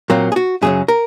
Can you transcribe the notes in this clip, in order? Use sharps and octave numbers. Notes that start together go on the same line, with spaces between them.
A#2 F#3 A#3 C4
G#4
F#4
F#2 C#3 F#3 G#4
A#4